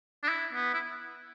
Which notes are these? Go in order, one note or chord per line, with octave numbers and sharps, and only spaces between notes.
D4
E4
B3
E4